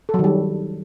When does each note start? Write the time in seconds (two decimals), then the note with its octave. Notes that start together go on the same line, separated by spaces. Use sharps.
0.09 A4
0.14 F#3
0.19 D#3
0.24 G3